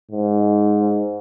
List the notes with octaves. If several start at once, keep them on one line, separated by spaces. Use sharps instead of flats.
G#2